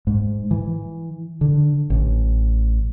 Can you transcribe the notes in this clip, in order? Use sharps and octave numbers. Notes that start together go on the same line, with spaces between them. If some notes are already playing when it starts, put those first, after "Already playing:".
G#2
E3
D3
A1